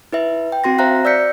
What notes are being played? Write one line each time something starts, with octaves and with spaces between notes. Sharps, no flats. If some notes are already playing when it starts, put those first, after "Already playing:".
E4 B4 E5
G5
C4 F#4 C6 A#6
C5 E5 F5 A#5 F#6 A#6
D5 E6 G6 B6 C#7